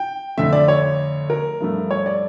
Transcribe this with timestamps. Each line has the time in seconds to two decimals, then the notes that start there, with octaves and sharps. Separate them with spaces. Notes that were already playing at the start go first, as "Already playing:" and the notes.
Already playing: G5
0.38 F2 D3 A3 E5
0.53 D5
0.68 C#5
1.30 A#4
1.61 G2 F3 A3
1.91 C#5
2.06 D5